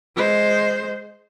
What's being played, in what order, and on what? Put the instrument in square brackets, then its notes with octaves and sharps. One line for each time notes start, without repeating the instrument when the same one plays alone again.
[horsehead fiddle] G#3 C5